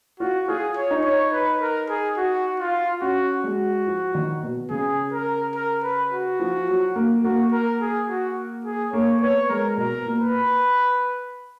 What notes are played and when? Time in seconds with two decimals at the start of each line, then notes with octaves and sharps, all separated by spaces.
0.20 F4 F#4
0.48 F4 G#4
0.77 C#5
0.91 D#4
1.04 C#5
1.32 B4
1.61 A#4
1.89 G#4
2.17 F#4
2.60 F4
3.02 C#4 F#4
3.44 G#3 F#4
3.87 F3
4.15 D#3
4.43 B2
4.70 C#3 G#4
5.12 A#4
5.55 A#4
5.83 B4
6.12 F#4
6.40 F3
6.68 F#3
6.96 A#3
7.24 A#3 F#4
7.52 A#4
7.81 G#4
8.09 F#4
8.65 G#4
8.93 A#3 C#5
9.22 B3 C#5
9.49 G#3 A#4
9.77 B2 A#4
10.06 A#2
10.20 B4